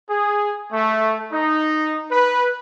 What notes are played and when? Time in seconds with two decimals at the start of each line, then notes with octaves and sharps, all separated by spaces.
0.10 G#4
0.73 A3
1.33 D#4
2.11 B4